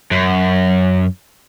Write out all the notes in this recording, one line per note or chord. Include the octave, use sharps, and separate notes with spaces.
F#2